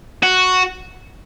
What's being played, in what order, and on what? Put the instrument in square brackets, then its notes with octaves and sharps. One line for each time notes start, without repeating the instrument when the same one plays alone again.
[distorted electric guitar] F#4